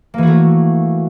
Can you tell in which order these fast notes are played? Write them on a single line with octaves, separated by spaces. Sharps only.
A#3 E3 F#4 A3